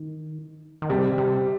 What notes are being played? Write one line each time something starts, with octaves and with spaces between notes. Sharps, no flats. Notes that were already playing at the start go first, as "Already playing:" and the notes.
Already playing: D#3
D#3
C3 G3
C3